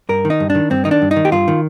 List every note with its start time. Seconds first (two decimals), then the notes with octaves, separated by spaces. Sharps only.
0.09 G2 A#4
0.25 D#3
0.30 D#4
0.40 G2
0.50 D4
0.55 D#3
0.70 G2 C4
0.85 D#3 D#4
0.91 D4
1.02 G2
1.11 D#4
1.16 D#3
1.25 G4
1.32 G2 F4
1.48 D#3